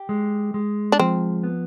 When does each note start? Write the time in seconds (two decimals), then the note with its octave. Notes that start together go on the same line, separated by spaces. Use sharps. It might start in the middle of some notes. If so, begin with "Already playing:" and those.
Already playing: G4
0.09 G#3
0.54 G#3
0.92 D4
0.99 F3 C4
1.44 B3